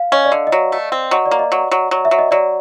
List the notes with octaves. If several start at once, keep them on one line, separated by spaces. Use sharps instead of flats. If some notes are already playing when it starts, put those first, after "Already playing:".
Already playing: F5
C#4 D#5
D5
D3 D#5
D#5
F#3 D5
A3
C4
F#3 D#5
D5
A#3
D#5
F#3
F#3
F#3
E5
F#3
D#5
F#3 D5